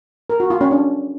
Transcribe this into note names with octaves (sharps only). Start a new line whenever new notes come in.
A#4
F#4
F4
C#4
D4